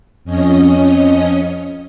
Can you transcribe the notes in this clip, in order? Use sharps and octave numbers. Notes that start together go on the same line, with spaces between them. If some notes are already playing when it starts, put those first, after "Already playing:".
F2 C#4 D#5